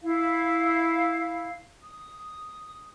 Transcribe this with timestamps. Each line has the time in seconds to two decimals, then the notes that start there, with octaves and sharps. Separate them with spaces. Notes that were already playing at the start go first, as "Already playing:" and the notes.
0.02 E4 F5
1.83 D#6